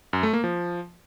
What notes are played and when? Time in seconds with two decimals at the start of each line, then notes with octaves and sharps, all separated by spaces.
0.13 F#2
0.23 A3
0.33 A#3
0.44 F3